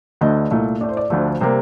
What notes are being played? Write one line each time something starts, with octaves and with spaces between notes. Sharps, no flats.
D2 D3 A3 D#5
C2 A#2 A3
A2 A3 D5
C5
D5
D2 D3 F3 A3
C3 G3 A#3 C5